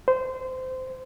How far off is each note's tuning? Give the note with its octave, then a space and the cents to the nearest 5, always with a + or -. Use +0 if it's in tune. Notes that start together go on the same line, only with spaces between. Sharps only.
C5 -20